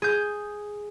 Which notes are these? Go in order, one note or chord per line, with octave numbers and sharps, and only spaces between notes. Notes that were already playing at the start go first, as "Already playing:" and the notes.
G#4 G6